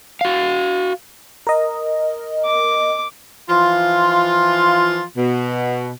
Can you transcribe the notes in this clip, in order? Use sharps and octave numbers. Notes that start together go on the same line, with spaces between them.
F#4 F5
A#4 D#5
D6
E3 F3 F4
B2